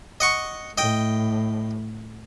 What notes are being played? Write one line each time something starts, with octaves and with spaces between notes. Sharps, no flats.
D#5 F#5 C#6
A2 D#5 G5